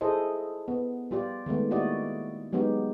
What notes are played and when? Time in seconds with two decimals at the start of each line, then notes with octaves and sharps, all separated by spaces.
0.01 E4 G#4 A4 C5 D#5
0.68 B3
1.11 G3 F4 G4 D5
1.46 D#3 G#3 A3 B3
1.71 A#3 E4 F#4 G4 D5 D#5
2.53 F#3 G#3 B3 D#4 G4